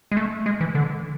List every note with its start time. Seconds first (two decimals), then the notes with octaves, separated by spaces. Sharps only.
0.12 G#3
0.17 A3
0.46 G#3
0.61 E3
0.75 D3